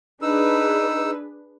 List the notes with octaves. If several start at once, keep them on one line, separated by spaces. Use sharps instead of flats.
D4 D#4 G#4 B4 E6